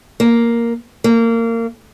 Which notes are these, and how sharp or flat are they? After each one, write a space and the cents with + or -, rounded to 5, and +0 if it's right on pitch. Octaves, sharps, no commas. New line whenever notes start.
A#3 +0
A#3 -25